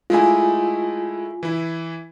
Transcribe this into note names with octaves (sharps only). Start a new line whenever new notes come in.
G#3 A3 E4 F4 G#5
E3 E4